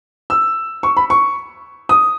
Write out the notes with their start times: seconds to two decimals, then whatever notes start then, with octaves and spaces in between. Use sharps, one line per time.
0.30 E6
0.83 C#6
0.97 B5
1.10 C#6
1.89 D#6